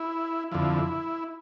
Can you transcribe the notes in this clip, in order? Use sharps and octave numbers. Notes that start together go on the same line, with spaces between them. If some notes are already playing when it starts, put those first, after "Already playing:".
Already playing: E4
F2 D3 F3 E4